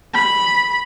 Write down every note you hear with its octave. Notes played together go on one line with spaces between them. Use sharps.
B5